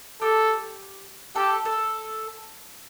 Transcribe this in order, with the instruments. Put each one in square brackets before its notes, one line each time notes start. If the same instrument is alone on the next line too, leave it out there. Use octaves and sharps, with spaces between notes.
[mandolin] G4 [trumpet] A4
[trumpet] G4 [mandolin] A4
[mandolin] A4